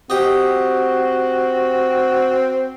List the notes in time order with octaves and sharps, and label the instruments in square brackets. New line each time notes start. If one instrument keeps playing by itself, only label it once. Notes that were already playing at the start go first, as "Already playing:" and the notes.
[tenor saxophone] C4 [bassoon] F#4 [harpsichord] G4 D#5